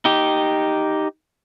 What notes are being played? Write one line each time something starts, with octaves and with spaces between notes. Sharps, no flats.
D#4 G4